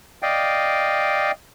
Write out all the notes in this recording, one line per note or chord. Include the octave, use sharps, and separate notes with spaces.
D5 D#5 F5 G5